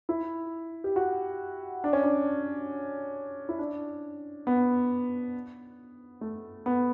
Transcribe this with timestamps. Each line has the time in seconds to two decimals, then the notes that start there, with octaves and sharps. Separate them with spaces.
0.09 E4
0.84 G4
0.96 F#4
1.84 D4
1.93 C#4
2.04 D4
3.49 E4
3.59 D4
4.47 B3
6.21 A3
6.66 B3